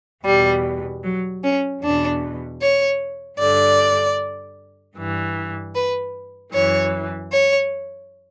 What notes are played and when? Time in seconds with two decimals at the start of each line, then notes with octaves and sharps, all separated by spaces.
0.25 E2 B2 G3
1.03 F#3
1.43 C#4
1.81 E2 B2 D4
2.60 C#5
3.39 G2 D3 D5
4.96 G2 E3
5.74 B4
6.53 F#2 E3 C#5
7.31 C#5